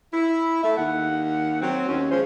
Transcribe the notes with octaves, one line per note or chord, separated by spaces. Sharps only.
E4
A3 E5
D#2 F#5
F#3 C4
D#2 C#4
F3 G#3 F4 C5 C#5